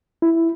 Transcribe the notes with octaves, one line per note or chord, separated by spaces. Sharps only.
E4